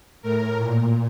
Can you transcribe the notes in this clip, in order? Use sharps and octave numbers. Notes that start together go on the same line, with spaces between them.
A2 A#4
A#2